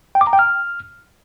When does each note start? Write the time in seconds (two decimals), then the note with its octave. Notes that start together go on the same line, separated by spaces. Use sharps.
0.15 G5
0.21 D6
0.27 A#5
0.33 G5
0.39 F6